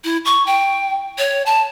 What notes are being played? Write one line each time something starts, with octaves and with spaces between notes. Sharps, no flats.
E4
C#6
G5
C#5
A5